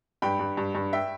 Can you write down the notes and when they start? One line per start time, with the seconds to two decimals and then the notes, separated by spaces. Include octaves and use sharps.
0.22 G2 G5 B5
0.40 G2
0.57 G2
0.75 G2
0.93 E5 G5